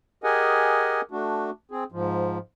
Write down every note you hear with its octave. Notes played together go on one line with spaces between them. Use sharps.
G4 G#4 A#4 D#5 F#5 G#5
A3 D4 F#4
C4 G#4
G#2 F3